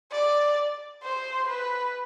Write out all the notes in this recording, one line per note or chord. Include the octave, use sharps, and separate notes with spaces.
D5
C5
B4